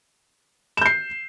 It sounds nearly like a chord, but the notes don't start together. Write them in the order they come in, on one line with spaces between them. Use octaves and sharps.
E7 G6 C7